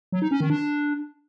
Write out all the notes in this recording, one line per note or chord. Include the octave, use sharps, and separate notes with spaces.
F#3
D#4
C#4
D#3
D4